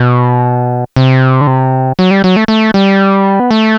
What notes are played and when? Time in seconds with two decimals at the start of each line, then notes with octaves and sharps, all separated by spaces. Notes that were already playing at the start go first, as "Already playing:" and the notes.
Already playing: B2
0.96 C3
1.41 D3
1.47 C3
1.99 F#3
2.11 G3
2.24 F#3
2.36 A3
2.48 A3
2.74 G3
3.40 B3
3.51 A3